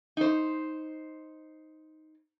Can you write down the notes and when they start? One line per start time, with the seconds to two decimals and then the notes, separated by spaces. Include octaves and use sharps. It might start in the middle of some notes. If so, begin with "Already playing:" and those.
0.17 D#4 C5